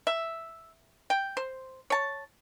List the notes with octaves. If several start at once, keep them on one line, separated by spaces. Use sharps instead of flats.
E5
G5
C5
C#5 A5